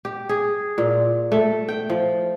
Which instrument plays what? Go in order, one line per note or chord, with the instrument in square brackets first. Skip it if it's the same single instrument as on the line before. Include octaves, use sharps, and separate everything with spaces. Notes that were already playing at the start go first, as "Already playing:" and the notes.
[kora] G4
G#4
A#2
A3
G5
F3